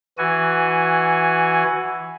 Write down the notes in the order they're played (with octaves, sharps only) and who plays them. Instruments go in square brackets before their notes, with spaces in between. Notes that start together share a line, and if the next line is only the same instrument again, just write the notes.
[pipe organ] E3 F#4 G#5